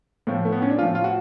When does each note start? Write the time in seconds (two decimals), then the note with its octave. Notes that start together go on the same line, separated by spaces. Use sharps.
0.27 A2 F3
0.45 A3
0.52 B3
0.62 C#4
0.70 D4
0.78 F3 F4
0.83 A2
0.95 F4
1.04 F#4